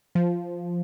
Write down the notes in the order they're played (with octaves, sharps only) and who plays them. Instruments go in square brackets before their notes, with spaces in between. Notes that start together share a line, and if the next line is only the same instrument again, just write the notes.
[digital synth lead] F3